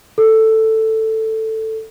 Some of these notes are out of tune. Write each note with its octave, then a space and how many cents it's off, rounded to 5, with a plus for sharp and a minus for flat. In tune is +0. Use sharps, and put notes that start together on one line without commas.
A4 +5